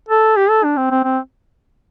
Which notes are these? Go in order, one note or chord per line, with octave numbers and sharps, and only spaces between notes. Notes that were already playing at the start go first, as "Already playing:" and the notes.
A4
G4
A4
D4
C4
C4
C4